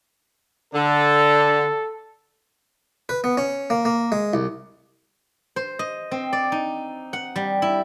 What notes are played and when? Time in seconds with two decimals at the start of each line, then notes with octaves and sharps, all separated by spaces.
0.74 D3 A4
3.09 B4
3.24 B3
3.37 C#4
3.70 A#3
3.85 A#3
4.12 G#3
4.33 C2
5.56 C5
5.79 D#5
6.11 C4
6.33 D5
6.52 D#4
7.13 F#5
7.36 G3
7.62 E4